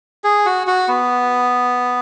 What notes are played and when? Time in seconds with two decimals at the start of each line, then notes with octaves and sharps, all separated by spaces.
0.24 G#4
0.46 F#4
0.67 F#4
0.88 B3